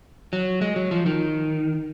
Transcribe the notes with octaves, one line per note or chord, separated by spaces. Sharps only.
F#3
G#3
F#3
F3
D#3